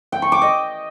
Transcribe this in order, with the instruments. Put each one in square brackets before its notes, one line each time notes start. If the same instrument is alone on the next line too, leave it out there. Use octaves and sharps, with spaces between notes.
[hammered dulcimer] G5
C#6
D6
D#5